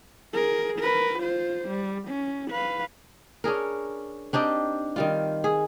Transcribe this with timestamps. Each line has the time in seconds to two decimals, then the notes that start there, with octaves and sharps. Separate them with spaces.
0.33 G#4 A#4
0.79 A#4 B4
1.19 F4 C5
1.69 G3
2.08 C#4
2.51 B4 F5
3.44 C#4 D4 G#4 A#4
4.33 C4 D4 D#4 G4
4.96 D#3 G3 F4
5.44 G#4